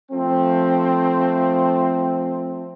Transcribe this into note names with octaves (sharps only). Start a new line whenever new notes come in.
F3 A3 C4